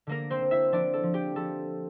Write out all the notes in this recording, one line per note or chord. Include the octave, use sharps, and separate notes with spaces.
D3 A#3 A#4
C4 C5
D3
E4 E5
F3 D4 D5
A4
F3
G4
F3 A4